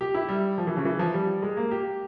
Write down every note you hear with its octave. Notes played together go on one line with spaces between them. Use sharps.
G4
E4
G3
F3
E3
C#3
E3
F3
G3
G#3
A#3
G4